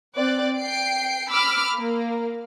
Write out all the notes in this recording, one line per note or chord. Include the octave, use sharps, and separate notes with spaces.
C4 D5 F#6
G5 C7 D7
B5 D6 E6 F6
A#3